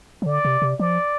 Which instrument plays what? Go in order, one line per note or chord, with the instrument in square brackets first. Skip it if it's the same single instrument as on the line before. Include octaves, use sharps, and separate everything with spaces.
[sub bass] F3
[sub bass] D3 [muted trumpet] D5
[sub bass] C3
C3
[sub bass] F3 [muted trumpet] D5